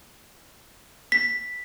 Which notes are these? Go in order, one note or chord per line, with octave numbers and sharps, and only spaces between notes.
B6